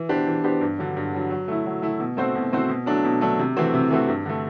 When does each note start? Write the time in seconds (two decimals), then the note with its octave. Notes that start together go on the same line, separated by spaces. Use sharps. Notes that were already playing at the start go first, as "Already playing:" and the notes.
Already playing: E3
0.09 B3 D4 G4 C5
0.27 E3
0.44 B3 D4 G4 C5
0.61 G2
0.78 D3 F#3
0.97 G2
1.13 D3 F#3
1.30 F#3
1.48 A3 E4
1.66 F#3
1.82 A3 E4
2.00 B2
2.17 A3 C4 F#4 C5
2.35 B2
2.52 A3 C4 F#4 C5
2.70 B2
2.86 F#3 A3 D4
3.05 B2
3.21 F#3 A3 D4
3.39 C3
3.56 E3 A3 C4 F#4
3.74 C3
3.91 E3 A3 C4 F#4
4.08 G2
4.26 D3 A3